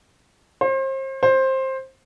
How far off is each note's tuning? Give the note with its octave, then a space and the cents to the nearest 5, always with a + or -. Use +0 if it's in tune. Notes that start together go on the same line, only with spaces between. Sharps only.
C5 +35
C5 +15